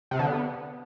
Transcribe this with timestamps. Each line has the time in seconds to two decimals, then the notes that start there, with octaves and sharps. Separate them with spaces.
0.11 C3
0.19 D3
0.27 B3